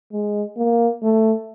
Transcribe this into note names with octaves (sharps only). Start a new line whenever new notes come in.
G#3
A#3
A3